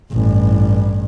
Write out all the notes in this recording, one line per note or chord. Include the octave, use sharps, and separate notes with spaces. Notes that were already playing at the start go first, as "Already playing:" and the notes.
A1 G2